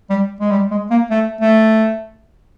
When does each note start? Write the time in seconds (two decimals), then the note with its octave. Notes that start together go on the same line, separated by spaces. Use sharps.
0.10 G3
0.40 G#3
0.51 G3
0.71 G#3
0.91 A#3
1.10 A3
1.41 A3